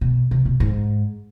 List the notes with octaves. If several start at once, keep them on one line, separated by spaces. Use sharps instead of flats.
B2
C3
B2
G#2